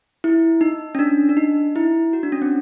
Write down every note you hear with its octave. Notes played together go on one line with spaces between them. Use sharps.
E4
D#4
C#4
D4
D4
D#4
E4
F#4
D4
C#4
C4